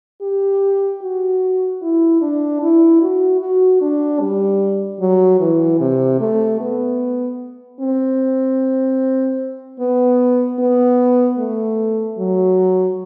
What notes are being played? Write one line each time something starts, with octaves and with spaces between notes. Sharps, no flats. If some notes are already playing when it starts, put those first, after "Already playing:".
G4
F#4
E4
D4
E4
F#4
F#4
D4
G3
F#3
E3
C3
A3
B3
C4
B3
B3
A3
F#3